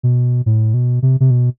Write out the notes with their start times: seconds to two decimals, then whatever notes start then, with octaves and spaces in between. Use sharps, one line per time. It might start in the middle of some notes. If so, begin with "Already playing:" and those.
0.03 B2
0.46 A2
0.74 B2
1.02 C3
1.20 C3
1.30 B2